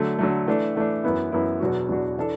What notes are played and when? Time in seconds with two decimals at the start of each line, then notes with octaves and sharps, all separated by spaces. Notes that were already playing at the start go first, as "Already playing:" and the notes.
Already playing: D3 F#3 A3
0.18 D3 F#3 A3
0.47 E3 A3 D4
0.76 E3 A3 D4
1.04 F#2 E3 B3 E4
1.32 F#2 E3 B3 E4
1.60 E2 B2 F#3 D4 F#4
1.89 E2 B2 F#3 D4 F#4
2.18 E3 D4 A4